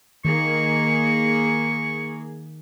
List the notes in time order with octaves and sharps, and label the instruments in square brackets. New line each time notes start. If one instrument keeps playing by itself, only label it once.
[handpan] D#3 [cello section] A#3 G#4 [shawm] C#6